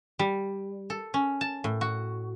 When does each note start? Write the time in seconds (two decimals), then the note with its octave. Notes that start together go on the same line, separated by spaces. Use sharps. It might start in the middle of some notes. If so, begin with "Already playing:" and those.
0.19 G3
0.90 A4
1.14 C#4
1.41 A5
1.64 A2
1.81 F#4